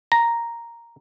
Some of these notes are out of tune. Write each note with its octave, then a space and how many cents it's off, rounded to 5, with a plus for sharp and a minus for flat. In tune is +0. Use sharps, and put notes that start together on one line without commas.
A#5 +0